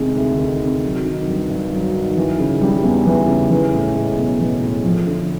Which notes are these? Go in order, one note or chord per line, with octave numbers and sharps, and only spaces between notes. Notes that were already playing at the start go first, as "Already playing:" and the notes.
Already playing: C3 D#3 G#3
D2
D#3
C3
F#3
D#3
G2
G2
F#3
D#3
E3
C#3
G3
E2
E3
C#3
E3
A2
G#3
B1
E3
A2
F3
D3